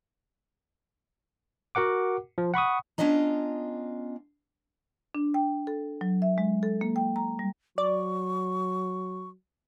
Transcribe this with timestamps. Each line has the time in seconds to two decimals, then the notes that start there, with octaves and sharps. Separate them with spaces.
1.75 F#4 A#4 F#5 D6
2.38 F3
2.54 F#5 B5 C#6 D#6
2.98 B3 C#4 D4 F4 D#5 A#5
5.15 D4
5.34 G5
5.67 A4
6.01 F#3
6.22 E5
6.38 G#3
6.63 A4
6.81 A#3
6.96 G5
7.16 A#5
7.39 G3
7.78 F#3 D5 C#6